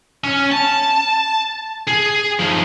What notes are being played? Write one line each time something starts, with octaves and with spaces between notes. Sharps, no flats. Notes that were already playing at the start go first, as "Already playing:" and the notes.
C#4
A5
G#4
F3 D#4